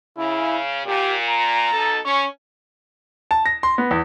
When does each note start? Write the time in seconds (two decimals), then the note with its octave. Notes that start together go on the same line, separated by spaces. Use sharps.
0.18 C#3 E4
0.86 A#2 G4
1.29 A#5
1.72 B2 D#4 A4
2.05 C#4 C#6
3.31 A5
3.46 A#6
3.63 C6
3.78 B3
3.91 E2